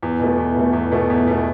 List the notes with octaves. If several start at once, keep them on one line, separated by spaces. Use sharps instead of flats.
E2
B2 A3
E2
B2 A3
E2
B2 A3
E2
B2 A3